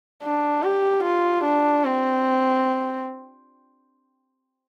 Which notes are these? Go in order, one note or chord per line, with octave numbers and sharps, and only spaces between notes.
D4
G4
F4
D4
C4